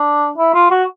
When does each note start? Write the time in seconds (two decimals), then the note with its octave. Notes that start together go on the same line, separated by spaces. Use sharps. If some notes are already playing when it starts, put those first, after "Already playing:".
Already playing: D4
0.38 E4
0.54 F4
0.71 F#4